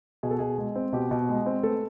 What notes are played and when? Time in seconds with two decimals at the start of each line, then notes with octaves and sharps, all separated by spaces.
0.23 B2 G#4
0.31 A4
0.39 B2 G#4
0.58 G#3
0.75 C4
0.93 B2 G4
1.11 B2
1.29 G#3
1.46 C4
1.63 A3 A4 B4